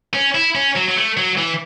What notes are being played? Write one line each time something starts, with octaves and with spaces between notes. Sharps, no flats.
C#4
E4
C#4
F#3
F#3
A3
F#3
E3